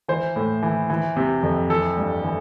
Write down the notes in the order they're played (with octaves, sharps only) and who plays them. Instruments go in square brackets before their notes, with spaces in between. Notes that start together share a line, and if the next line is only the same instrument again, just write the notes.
[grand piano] E3 C5
A2
E3
E3
C3
F2
E3 A4
G2
E3